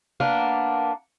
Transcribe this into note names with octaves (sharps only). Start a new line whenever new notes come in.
A#3 B3 D4